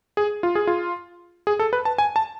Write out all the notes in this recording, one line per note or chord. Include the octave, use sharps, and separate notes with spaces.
G#4
F4
G#4
F4
G#4
A4
B4
A5
G#5
A5